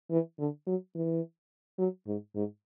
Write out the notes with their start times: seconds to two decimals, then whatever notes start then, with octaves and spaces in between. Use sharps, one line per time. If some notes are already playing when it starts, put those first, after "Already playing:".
0.11 E3
0.39 D3
0.67 F#3
0.95 E3
1.78 F#3
2.07 G#2
2.35 G#2